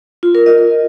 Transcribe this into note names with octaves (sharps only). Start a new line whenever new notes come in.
F4
A#4
D#5